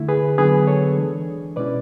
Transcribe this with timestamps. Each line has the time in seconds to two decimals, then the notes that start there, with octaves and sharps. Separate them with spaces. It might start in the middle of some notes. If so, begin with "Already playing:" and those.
Already playing: D3 A3 E4
0.09 G#4 B4
0.38 D3 F#3 B3 D4 G#4 B4
0.67 A4 C#5
0.97 E3 G#3 D4
1.56 B2 G#3 C#4 E4 B4 D5